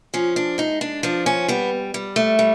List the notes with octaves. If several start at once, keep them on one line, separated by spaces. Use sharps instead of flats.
F3 C#4
D4
G#3 D#4
D4
F3 D4
C#4
G3 B3
G3
A3
G3